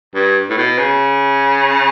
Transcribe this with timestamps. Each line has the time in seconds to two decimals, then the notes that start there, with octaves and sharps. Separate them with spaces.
0.14 G2
0.50 A2
0.58 B2
0.78 C#3